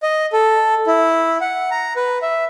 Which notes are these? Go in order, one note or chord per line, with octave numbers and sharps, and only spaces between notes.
D#5
A4
E4
F#5
A#5
B4
E5